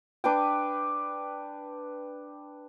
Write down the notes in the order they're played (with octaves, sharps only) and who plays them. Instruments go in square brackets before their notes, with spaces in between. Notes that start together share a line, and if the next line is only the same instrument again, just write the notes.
[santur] D4 B4 G5